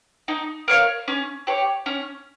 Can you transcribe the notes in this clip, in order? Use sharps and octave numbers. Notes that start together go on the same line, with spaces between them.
D#4
A#4 C#5 F5
C#4
G4 C#5
C#4